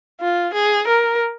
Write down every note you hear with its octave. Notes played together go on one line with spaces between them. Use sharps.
F4
G#4
A#4